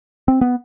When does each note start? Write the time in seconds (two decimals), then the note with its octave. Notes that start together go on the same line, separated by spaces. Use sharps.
0.28 C4
0.41 B3